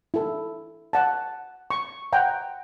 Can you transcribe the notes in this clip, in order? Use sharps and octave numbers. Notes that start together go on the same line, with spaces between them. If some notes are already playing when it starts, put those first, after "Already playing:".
E4 A4
F#5 A5
C#6
F#5 G5 A#5